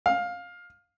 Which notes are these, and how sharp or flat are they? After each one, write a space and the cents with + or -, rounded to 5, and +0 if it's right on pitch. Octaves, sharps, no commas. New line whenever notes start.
F5 +15